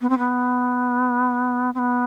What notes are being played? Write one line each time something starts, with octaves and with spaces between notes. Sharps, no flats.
B3
C4
B3
C4
B3